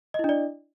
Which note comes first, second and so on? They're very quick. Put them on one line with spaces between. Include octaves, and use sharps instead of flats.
D#5 E4 D4 D5